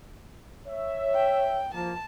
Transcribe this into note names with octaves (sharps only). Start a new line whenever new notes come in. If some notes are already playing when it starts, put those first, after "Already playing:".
C#5 E5
G5
F3 A#3 A5